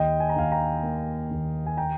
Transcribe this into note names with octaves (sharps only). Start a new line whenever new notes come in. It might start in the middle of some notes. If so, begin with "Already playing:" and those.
Already playing: D#2 D#5 G5
G#5
A#5
D#2 F5 G#5
G5 A#5
A#3
D#2
G#5
G5 A#5